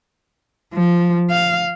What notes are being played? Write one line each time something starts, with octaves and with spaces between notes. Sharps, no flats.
F3
F5